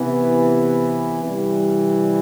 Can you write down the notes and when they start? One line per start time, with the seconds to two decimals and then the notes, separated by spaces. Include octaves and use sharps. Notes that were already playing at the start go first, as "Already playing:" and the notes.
Already playing: C3 E3 B3
1.22 C3 E3 G3